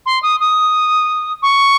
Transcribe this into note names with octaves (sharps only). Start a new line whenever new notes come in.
C6
D#6
D#6
C#6